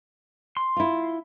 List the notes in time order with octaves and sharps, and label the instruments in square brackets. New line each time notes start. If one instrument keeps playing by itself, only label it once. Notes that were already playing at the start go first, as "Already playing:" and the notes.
[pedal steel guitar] C6
[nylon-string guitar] E4 F4